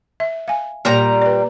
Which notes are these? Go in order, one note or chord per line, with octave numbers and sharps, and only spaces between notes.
E5
F5 G#5
A#2 G3 A#3 A#5
B4 D5